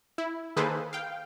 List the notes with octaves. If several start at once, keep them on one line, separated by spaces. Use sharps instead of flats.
E4
D#3 A#3 G#4 A4 B4 C5
F5 G5